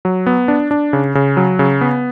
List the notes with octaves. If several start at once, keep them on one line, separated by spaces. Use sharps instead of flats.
F#3
B3
D4
D4
C#3
C#3
F#3
C#3
B3